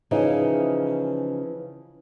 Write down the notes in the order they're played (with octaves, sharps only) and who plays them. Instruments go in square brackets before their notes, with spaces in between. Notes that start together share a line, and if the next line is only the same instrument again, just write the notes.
[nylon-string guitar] C#3 E3 F3 D#4